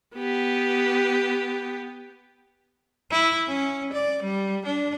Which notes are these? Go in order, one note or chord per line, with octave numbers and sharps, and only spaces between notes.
B3 G4
E4
C#4
D5
G3
D4